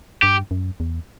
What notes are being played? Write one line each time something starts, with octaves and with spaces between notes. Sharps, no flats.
G2 G4
F#2
E2